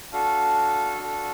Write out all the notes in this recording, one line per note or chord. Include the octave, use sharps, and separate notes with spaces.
D4 F#4 A4 F5
D4 F#4 A4